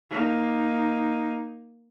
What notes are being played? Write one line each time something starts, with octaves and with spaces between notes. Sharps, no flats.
A#3 D#4